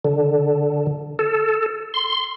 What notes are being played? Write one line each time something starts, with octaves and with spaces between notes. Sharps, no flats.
D3
A4
C6